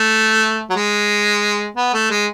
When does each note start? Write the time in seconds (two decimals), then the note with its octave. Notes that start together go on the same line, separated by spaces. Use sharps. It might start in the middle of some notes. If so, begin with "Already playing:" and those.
Already playing: A3
0.70 F#3
0.76 G#3
1.76 B3
1.94 A3
2.11 G#3